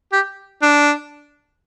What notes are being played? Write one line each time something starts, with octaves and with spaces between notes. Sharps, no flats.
G4
D4